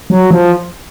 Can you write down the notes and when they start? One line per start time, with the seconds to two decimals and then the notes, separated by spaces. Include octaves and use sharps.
0.10 F#3
0.31 F3